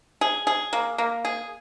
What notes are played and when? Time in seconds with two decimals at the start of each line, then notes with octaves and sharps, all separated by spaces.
0.21 G#4
0.47 G#4
0.73 A#3
0.98 A#3
1.25 G#4